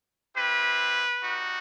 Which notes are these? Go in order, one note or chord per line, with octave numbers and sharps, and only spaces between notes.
C4 E4 G4 B4
G3 D#4 F#4